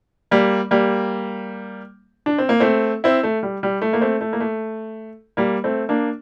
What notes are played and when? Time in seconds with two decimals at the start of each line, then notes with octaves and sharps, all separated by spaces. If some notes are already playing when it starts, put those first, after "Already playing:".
0.31 G3 A#3
0.71 G3 A#3
2.26 D4
2.38 C4
2.49 A#3
2.60 A3 C4
3.04 C4 E4
3.23 A3
3.43 G3
3.63 G3
3.82 A3
3.93 A#3
4.01 A3 C4
4.21 A3
4.33 A#3
4.40 A3
5.37 G3 A#3
5.64 A3 C4
5.89 A#3 D4